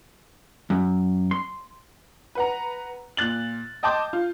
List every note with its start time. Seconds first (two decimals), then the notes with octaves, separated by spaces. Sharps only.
0.70 F#2
1.31 C6
2.35 B4 F#5 A#5
3.17 A#2 F#6 A6 F#7
3.83 D#5 G5 A5 C6 D6 G6
4.13 F4